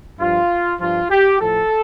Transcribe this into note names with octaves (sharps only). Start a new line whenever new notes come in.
G2 F3 F4
G2 F3 F4
G4
A2 F3 A4